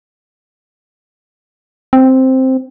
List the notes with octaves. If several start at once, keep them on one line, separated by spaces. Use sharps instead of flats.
C4